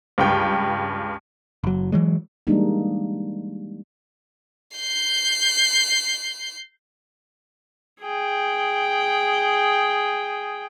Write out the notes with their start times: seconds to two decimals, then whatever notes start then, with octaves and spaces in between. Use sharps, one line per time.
0.18 C#2 G2 G5
1.64 F#1 F#3
1.92 E3 F#3 G#3
2.47 E3 G3 G#3 A#3 D4 D#4
4.76 G6 C7
8.03 G#4 G5